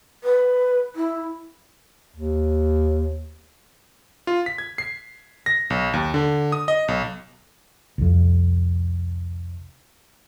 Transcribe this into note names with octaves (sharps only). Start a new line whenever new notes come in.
B4
E4
D#2
F4
B6
G#6
C7
A#6
B1
D#2
D3
D#6
D#5
B1
C2 F2